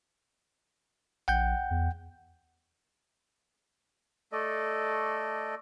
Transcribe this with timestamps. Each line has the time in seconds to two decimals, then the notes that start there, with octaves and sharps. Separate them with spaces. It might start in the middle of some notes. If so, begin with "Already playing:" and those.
1.28 A#1 F#5 G5 G6
1.71 E2
4.32 A3 A4 D5 D#5